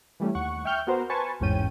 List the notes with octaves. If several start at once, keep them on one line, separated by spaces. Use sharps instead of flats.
E3 G3 A3 C#4
D#2 F#5 C#6
E5 G5 C#6 F6 G6
B3 F#4 A#4 C5
B4 C5 G#5 A5 C#6
A1 E2 G#2 C#4 G5 D#7